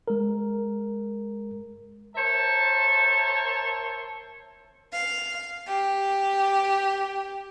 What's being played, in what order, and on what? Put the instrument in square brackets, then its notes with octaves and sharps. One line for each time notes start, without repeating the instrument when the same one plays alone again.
[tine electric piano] G#3 A#4
[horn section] A#4 C5 C#5 E5 A5
[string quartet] F5
G4